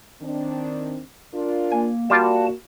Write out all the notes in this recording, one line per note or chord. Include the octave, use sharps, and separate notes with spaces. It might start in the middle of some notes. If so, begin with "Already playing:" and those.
D#3 C4 D4
D4 F4 A#4
A#3 G#5
G3 A#3 F4 F#4 D5 A5